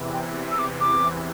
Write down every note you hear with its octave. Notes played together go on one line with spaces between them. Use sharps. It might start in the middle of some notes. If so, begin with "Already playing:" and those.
Already playing: E2 C3 E3
G5
E6
D6
D6